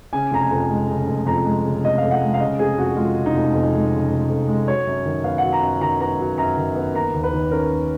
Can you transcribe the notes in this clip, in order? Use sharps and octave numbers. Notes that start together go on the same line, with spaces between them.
C#3 G#5
F1 A#5
G#5
F2
G#3
C#3
F1
F2 A#5
G#3
C#3
F1 D#5
F2 F5
F#5
G#3
F5
C#3 D#5
F1 G#4
F2 F#4
G#3 F4
C#3
D#4
F1
F2
G#3
C#3
F1
F2
G#3
F#3 C#5
F#2
D#3
B3 F5
F#3 F#5
A#5
F#2
D#3 A#5
B3 A#5
F#3
F#2 A#5
D#3
B3
A#3 A#5
D#2
B4
D#3
C#4 A#4
A#3